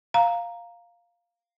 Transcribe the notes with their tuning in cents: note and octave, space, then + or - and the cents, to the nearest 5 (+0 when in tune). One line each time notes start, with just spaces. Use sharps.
F5 +0 A#5 +0